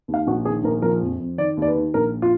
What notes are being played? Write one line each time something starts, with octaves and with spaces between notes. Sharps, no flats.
D#2
F5
A#1 F#4
D#3 G#4
A#1 A#4
F3 A#4
F2
F2
D#3 D5
D#2 D5
B4
D#3
A#1 A#4
F4